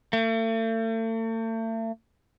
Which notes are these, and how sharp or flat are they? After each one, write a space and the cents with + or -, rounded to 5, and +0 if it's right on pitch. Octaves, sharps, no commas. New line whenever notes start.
A3 +40